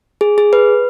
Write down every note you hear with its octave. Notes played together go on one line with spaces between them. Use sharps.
G#4
G#4
B4